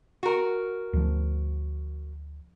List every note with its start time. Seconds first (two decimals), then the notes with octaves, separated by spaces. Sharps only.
0.23 F#4 A#4
0.93 D2 F3